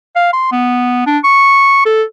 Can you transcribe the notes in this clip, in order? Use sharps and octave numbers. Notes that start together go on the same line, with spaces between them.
F5
C6
B3
D4
C#6
A4